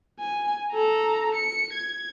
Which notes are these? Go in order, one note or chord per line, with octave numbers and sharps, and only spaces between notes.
G#5
A4 A#5
C#7
G#6